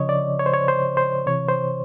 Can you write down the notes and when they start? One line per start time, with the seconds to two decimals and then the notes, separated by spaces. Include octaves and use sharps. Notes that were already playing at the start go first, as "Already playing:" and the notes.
Already playing: C#3 F3 C#5 D#5
0.09 D5
0.39 C#5
0.46 C5
0.53 C#5
0.68 C5
0.97 C5
1.26 C3 E3 C#5
1.49 C5